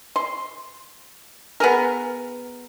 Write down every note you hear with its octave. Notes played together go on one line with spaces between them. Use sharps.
C6
B3 G#4 A#4